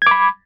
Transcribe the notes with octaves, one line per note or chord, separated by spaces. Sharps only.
B5 D6 G#6